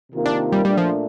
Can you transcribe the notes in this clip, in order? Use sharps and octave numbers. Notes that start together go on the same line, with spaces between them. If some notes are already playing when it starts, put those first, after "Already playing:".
C3 D#3 A#3 F4 A#4
D4
G3
A#2 G3 A3 D4
F3